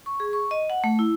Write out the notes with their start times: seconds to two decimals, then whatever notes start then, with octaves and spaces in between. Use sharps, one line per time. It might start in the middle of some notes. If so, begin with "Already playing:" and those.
0.06 C#6
0.20 G#4
0.33 C#6
0.51 D#5
0.70 F#5
0.84 A3
0.99 E4